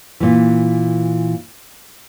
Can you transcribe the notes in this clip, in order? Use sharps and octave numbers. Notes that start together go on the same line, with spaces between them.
A#2 E3